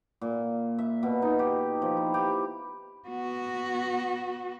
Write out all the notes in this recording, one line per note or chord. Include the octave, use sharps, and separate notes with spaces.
A#2
E5
B2
D#4
G4
F3
E4
G4
B3 F#4